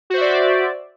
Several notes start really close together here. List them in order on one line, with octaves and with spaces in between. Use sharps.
F#4 C5 E5 D5